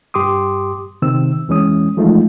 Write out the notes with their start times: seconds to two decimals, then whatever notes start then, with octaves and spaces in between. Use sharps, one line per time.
0.14 G2 G4 C6 D6 D#6
1.02 C3 D#3 C4 E6
1.48 E2 E3 G#3 C#4 D#6
1.97 E3 F3 G#3 A3 D#4 F4